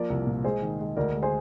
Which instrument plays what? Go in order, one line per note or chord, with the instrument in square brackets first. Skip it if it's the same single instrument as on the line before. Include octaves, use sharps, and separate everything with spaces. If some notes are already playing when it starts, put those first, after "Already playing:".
Already playing: [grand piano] F3 A#3 [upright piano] A#4 D5
[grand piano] C2
A#2
[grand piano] G#3 [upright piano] G#4 C5
[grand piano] D#3
G#3
[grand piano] D2 [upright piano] A#4 D5
[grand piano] G#3
[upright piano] G#4 C5